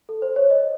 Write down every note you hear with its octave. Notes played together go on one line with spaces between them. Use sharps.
A4
C5
C#5
D#5